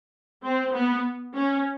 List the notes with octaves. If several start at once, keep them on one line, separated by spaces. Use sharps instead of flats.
C4
B3
C#4